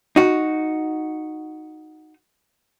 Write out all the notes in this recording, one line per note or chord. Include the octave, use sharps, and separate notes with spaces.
D#4 F#4